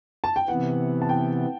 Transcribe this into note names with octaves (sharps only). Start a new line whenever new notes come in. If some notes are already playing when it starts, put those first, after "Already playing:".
A5
G5
C3 E3 B3 F#5
A5
G5